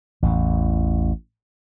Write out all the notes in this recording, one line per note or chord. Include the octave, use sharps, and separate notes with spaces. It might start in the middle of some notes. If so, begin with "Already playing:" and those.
A1 E2